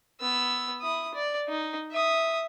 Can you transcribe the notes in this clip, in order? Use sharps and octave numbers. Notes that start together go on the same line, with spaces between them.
B3 E6
E4 D#6
D5
D#4
E5 D#6